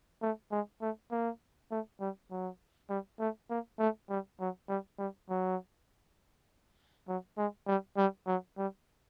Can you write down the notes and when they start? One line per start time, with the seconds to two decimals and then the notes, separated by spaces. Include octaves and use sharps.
0.22 A3
0.52 G#3
0.82 A3
1.12 A#3
1.71 A3
2.01 G3
2.31 F#3
2.90 G3
3.20 A3
3.50 A#3
3.79 A3
4.10 G3
4.40 F#3
4.69 G3
4.99 G3
5.30 F#3
7.08 F#3
7.38 G#3
7.67 G3
7.98 G3
8.27 F#3
8.58 G3